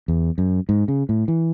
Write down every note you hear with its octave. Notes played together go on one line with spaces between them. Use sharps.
E2
F#2
G#2
C#3
A2
E3